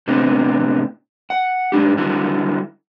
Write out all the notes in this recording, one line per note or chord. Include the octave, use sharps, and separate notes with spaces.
A2 C3 B3 C4 D4
F#5
G#2 G#3 D4 G4
D3 G3 E4 F#4